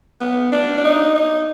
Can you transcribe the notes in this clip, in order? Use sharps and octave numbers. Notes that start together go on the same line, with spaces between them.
B3
D4
D4
D#4
D#4